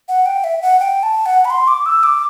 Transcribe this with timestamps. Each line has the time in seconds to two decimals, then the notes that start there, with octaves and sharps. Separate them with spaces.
0.08 F#5
0.26 G5
0.44 E5
0.62 F#5
0.80 G5
1.03 A5
1.26 F#5
1.45 B5
1.50 C6
1.67 D6
1.86 E6
2.03 D6